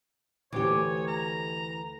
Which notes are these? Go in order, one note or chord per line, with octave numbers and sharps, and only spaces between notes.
D2 E3 G4 C#5 D#5 D6
A#5